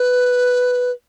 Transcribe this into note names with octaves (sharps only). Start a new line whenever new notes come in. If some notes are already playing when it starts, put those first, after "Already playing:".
Already playing: B4